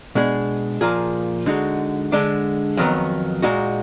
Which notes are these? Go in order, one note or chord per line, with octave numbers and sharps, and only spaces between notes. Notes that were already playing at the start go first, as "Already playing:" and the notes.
B2 G#3 D4 G#4
A#2 F3 A#3 F4 G#4
D3 G#3 D#4 F#4
D3 G#3 D4
F2 D#3 F#3 B3
A#2 G#3 D#4 F#4